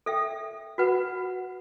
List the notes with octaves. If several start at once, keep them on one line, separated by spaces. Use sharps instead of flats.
A4 E5 G5
F#4 B4 F#5